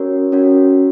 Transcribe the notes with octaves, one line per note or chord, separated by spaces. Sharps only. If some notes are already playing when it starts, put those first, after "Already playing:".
Already playing: C#4 F#4 A#4 C#5
C#4 F#4 A#4 C#5